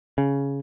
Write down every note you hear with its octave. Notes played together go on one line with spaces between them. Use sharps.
C#3